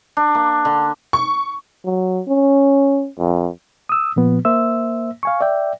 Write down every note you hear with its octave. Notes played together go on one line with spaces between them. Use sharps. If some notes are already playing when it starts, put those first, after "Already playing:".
D4
A#3
D3
C#6
F#3
C#4
F2
D#6 E6
A#2 F3 B3
A#3 C5 E5 E6
F5 G#5 C#6
D5 E5 G5